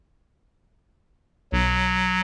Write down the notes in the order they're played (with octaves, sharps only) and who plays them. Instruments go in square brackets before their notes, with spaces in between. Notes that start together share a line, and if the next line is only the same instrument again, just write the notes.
[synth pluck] B1 [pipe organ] F#3